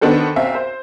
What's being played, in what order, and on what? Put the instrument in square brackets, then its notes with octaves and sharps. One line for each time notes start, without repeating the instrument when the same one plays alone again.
[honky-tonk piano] D#3 B3 D4 F#4 A4 C5
B1 C4 E5 F5
C5